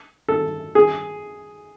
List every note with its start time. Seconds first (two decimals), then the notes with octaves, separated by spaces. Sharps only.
0.28 A4
0.75 G#4